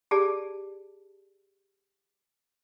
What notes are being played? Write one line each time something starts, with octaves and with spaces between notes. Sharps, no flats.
G4 G#4 D5 A5